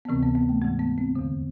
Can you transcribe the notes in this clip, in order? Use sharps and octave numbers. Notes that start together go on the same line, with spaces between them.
B3
D2 C3 E3 C4
B3
B3
A3
G#2 E3 G#3
B3
C4
E2 D3